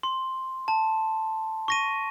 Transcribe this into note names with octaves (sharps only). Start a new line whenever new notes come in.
C6
A5
C#6 A#6 D#7